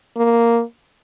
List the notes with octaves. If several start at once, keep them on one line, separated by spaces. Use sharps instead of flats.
A#3